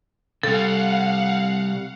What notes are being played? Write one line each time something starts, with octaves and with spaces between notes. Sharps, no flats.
C3 G3 A4 F5 F#5